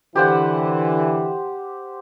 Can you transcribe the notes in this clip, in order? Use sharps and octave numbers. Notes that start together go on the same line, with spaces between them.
D3 E3 G4 C5 F#5